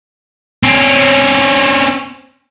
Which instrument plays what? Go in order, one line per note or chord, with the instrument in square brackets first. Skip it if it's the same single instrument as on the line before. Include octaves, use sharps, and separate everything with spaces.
[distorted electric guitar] C4 C#4